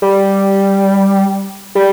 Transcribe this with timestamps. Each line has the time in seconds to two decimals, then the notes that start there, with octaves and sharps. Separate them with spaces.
0.02 G3
1.75 G3